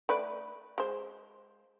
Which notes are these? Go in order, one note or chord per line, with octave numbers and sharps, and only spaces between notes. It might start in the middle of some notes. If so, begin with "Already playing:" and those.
A3 B4 D5
G#3 C5